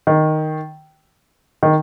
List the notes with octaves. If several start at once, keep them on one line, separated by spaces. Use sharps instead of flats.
D#3
D#3